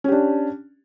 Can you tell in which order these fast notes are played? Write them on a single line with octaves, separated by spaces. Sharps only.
C#4 G4 D4